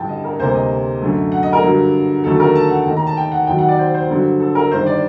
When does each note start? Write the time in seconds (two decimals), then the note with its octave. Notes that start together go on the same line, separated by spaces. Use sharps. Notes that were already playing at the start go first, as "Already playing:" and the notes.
Already playing: A1 G2 D3 G5 A5
0.09 D#5
0.24 A#4
0.39 D2 C3 G3 A#3 C5
0.55 D#5
1.02 F#2 D3 A3
1.32 F#5
1.43 D#5
1.53 A#4
1.63 G2 D3 F#3
2.24 D#2 D3 F#3 A3 A4
2.40 A#4
2.55 A5
2.70 F#5
2.85 D#2 D#3 A3 G5
2.97 A#5
3.07 A5
3.17 G5
3.32 F#5
3.47 D#2 D#3 F#3 G5
3.58 F#5
3.68 D5
3.79 C5
3.94 C5
4.09 G2 D3 F#3
4.40 A4
4.55 A#4
4.70 G1 G2 D#3 C5
4.86 D5